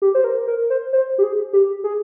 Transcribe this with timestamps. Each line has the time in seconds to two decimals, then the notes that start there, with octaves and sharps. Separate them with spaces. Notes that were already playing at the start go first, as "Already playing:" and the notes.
0.02 G4
0.14 C5
0.24 A#4
0.48 A#4
0.70 C5
0.93 C5
1.18 G4
1.23 G#4
1.53 G4
1.84 G#4